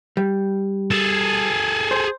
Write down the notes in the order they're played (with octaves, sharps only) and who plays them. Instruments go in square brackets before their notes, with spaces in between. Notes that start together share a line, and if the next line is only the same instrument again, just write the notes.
[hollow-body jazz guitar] G3
[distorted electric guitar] G#4 A4
[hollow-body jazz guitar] C5